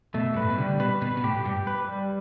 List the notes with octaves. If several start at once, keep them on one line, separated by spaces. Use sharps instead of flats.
B2 A3
G2
B4
A2
B2
D3 G3
B2 B4
B2 B4
B2
A2 G4
G2 G4
B4
G3